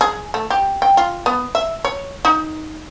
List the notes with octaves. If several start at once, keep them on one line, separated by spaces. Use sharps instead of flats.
G#4
A3
G4
G5
F4
B3
E5
C#5
D#4